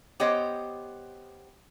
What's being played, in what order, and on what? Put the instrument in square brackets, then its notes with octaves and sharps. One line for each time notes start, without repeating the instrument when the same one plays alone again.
[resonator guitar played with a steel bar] B3 G4 C5 C#5 D#5